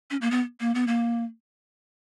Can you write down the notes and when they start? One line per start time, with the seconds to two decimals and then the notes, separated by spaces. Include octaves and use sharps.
0.11 C#4
0.21 A#3
0.31 B3
0.60 A#3
0.75 B3
0.87 A#3